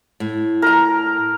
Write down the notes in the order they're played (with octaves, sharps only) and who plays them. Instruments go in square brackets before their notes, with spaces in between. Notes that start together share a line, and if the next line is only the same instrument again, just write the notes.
[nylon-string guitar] A2
[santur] A#4 A#5